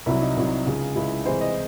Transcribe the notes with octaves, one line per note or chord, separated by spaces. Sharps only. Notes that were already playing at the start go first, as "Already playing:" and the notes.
C2 C3 F#3 E4
D#4
C2 C3 F#3
C#2 C#3 G#3
C#2 C#3 G#3 E4
C2 C3 E3 G#3 C5
D#5